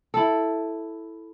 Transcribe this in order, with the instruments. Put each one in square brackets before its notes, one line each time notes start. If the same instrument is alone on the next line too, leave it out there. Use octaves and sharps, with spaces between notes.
[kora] E4 A4